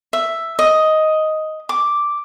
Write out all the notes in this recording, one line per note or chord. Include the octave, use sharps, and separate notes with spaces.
E5
D#5
D6